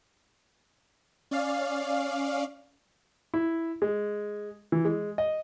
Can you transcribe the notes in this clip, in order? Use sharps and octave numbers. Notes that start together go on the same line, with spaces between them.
C#4 D5 F5
E4
G#3
E3
G#3
D#5